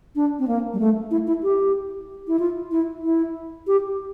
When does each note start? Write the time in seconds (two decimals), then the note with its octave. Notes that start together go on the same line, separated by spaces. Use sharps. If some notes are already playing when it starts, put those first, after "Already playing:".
0.16 D4
0.39 C4
0.48 A#3
0.73 G3
0.80 A3
1.11 E4
1.27 E4
1.43 G4
2.28 E4
2.39 F4
2.72 E4
3.03 E4
3.67 G4